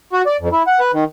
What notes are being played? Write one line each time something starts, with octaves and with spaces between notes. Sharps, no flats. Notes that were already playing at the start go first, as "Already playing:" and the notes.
F#4
D5
F2
E4
F#5
B4
D#3